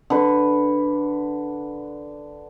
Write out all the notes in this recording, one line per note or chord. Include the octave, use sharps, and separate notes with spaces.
D3 B4